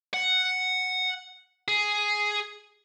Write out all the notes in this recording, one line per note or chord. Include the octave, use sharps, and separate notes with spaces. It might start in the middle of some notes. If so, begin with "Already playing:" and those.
F#5
G#4